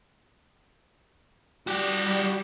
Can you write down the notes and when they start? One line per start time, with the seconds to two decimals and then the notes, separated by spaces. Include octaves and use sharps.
1.67 G3 F#4 G4